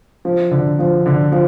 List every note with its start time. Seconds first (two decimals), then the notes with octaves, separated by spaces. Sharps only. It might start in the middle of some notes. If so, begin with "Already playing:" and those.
0.25 F3
0.51 D3
0.79 F3
1.06 D3
1.32 F3